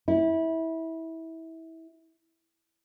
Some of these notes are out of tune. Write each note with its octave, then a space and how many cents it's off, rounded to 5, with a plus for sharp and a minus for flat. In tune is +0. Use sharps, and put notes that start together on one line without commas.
E4 -20